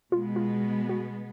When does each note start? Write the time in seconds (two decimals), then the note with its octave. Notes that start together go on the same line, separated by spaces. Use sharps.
0.12 B2 G#3 B3 F4
0.36 F4
0.89 F#4